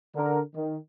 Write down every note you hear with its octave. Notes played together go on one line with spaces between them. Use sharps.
D3 A#4
D#3